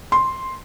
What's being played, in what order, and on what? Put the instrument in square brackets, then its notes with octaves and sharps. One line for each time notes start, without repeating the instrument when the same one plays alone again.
[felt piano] C6